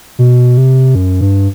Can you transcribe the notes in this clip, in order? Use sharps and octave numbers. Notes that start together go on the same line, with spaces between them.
B2
C3
F#2
G2